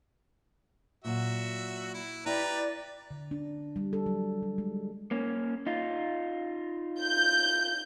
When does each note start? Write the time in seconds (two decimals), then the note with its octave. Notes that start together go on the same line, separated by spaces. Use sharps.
1.05 A#2 F#3 F#4 E5
1.94 E4
2.26 E4 G4 B4 D5 A#5
3.11 D3
3.31 D4
3.76 G3
3.93 A4
4.06 F#3
4.43 F#3
4.58 G#3
5.11 A#3 C#4
5.66 D#4 F4
7.00 G6